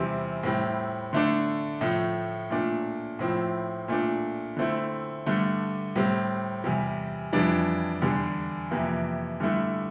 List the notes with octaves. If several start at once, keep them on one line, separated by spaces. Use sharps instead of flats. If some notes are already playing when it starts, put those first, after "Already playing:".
Already playing: E2 C3 G3 C4 E4
A2 G3 C4 E4
D3 A3 D4
A2 F3 A3
A#2 A3 D4
A2 F3 C4 E4
A#2 A3 D4
D3 A3 C4 E4
G2 D3 A3
A2 G3 C4
E2 C3 G3
F2 E3 G3 D4
E2 D3 G3 D4
F2 C3 E3 A#3
G2 D3 A3 E4